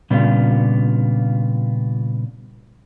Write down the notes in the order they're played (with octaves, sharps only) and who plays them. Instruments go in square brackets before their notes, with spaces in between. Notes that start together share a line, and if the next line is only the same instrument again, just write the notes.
[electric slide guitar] A#2 C#3 G3 B3 D4 F4